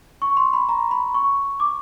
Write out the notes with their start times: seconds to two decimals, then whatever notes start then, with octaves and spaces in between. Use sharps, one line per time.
0.22 C#6
0.37 C6
0.53 B5
0.69 A#5
0.91 B5
1.15 C#6
1.60 D6